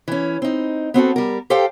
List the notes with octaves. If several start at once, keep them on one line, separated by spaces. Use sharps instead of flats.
E3 C#4
C4 D#4
B3 C4 F#4 A4
G3 A#4
G4 A4 C5 F5 G5